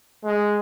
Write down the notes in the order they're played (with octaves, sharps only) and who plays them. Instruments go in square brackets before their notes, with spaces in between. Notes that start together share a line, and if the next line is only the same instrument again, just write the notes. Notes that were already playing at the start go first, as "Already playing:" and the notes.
[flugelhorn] G#3